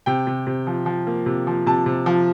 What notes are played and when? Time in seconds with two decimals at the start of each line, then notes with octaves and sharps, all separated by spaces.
0.06 C3 G5
0.27 C3
0.47 C3
0.67 F3
0.86 F3
1.07 A#3
1.26 C3
1.47 F3
1.66 C3 A5
1.86 C3
2.06 F3